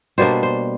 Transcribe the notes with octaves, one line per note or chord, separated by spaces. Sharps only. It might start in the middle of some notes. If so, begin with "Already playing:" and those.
B2 G3 A#3 D4 C5
C5